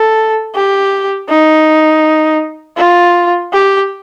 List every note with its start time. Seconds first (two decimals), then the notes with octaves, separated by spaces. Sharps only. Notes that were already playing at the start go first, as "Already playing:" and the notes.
Already playing: A4
0.55 G4
1.29 D#4
2.77 F4
3.53 G4